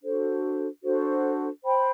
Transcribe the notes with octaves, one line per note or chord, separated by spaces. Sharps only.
D4 F#4 A4 C5
D4 F#4 A4 C5
C5 G5 B5